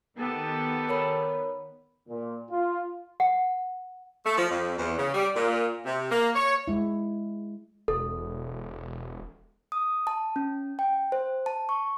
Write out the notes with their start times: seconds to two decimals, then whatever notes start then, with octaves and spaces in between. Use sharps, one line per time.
0.18 D#3 B3 G4 A4
0.89 A#4 C#5 B5
2.09 A#2
2.51 F4
3.20 F#5
4.25 A3
4.37 F3
4.50 F2
4.78 E2
4.97 C#3
5.14 G3
5.35 A#2
5.85 C3
6.10 A#3
6.36 C#5
6.68 G#3 E4
7.88 E1 A4
9.72 D#6
10.07 A5
10.36 C#4
10.79 G5
11.12 C5
11.46 A5
11.69 C#6